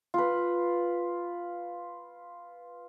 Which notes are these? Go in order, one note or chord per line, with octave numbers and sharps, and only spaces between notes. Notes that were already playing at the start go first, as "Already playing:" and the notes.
F4 B4